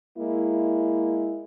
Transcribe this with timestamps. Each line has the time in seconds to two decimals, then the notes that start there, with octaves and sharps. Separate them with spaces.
0.18 G#3 A#3 E4